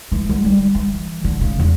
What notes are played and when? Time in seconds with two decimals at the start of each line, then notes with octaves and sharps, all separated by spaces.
0.12 E3
0.29 F#3
0.45 G3
0.75 E3
1.24 D3
1.41 C#3
1.59 E2